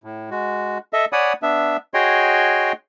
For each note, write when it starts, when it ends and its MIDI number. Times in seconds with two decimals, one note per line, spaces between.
0.04 0.30 45
0.31 0.78 56
0.31 0.78 66
0.93 1.05 69
0.93 1.05 75
0.93 1.05 76
1.13 1.33 73
1.13 1.33 74
1.13 1.33 78
1.13 1.33 80
1.13 1.33 83
1.13 1.33 87
1.42 1.77 59
1.42 1.77 62
1.42 1.77 76
1.94 2.72 66
1.94 2.72 68
1.94 2.72 73
1.94 2.72 75
1.94 2.72 79
1.94 2.72 84